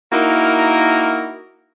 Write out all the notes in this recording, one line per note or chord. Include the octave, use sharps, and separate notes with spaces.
A#3 D#4 E4 F#4 A#4